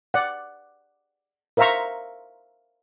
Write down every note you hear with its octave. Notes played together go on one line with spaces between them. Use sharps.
D5 F#5
A#4 C5 E5 F5 A#5 C#6